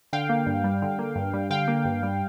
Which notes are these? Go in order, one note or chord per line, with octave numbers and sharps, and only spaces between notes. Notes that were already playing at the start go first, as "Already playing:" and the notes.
D3 F5 G5
A#3
G2
G3
D3
A#3
G2
G3
D3 F5 G5
A#3
G2
G3